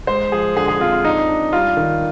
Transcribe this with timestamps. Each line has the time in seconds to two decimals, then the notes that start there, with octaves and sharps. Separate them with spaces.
0.07 G#3 C5
0.32 F3 G#4
0.56 D3 G#4
0.68 G#4
0.80 C4 F4
0.92 F4
1.04 D4 D#4
1.28 D4
1.53 G3 F4
1.77 D#3